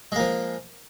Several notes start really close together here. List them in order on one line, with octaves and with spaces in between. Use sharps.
G#3 A#3 F3